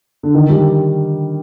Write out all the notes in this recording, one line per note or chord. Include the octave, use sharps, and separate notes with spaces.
D3
D#3
G3